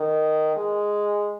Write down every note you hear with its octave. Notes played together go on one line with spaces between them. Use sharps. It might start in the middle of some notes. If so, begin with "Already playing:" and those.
Already playing: D#3
G#3